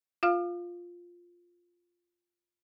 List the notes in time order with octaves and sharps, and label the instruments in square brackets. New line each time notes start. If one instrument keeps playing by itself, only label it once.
[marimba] F4 F5 F6